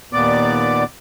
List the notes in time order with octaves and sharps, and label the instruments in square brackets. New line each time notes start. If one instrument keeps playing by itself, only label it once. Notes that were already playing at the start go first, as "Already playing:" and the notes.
[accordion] D#2 A#2 B3 D5 D6